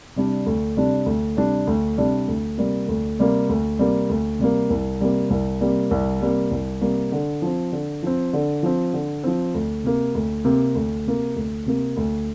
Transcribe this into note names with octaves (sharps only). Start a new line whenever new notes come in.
C3 G3 D4
D2
C3 G3 D4
D2
C3 G3 D4
D2
C3 G3 D4
D2
C3 G3 A#3
D2
C3 G3 A#3
D2
C3 G3 A#3
D2
C3 G3 A#3
C2
C3 G3 A#3
C2
C3 G3 A#3
C2
C3 G3 A#3
C2
C3 G3 A#3
D3
F3 C4
D3
F3 C4
D3
F3 C4
D3
F3 C4
D2
C3 A#3
D2
C3 A#3
D2
C3 A#3
D2
C3 A#3
D2